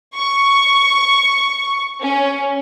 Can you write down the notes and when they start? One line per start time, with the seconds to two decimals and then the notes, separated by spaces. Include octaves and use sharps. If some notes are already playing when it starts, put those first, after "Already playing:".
0.16 C#6
2.02 C#4